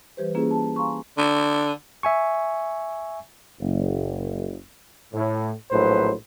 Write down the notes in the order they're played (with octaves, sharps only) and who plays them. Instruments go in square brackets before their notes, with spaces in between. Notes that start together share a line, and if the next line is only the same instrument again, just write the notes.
[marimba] E3 G3 G4 B4 C5
A#3 C#4 E4 F4 G#4
A5
F5 G#5 A#5 C6 C#6
[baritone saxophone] D3
[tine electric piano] E5 G#5 C#6
[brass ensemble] F#1
[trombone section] A2
A#1 A2 F#3 B4 C5